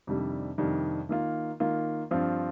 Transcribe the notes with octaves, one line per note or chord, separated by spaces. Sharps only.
F2 C3 D#3 G3 D4
F2 C3 D#3 G3 D4
D#3 A#3 F4
D#3 A#3 F4
G2 F3 C4 F4